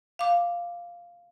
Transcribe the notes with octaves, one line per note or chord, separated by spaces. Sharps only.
F5 D6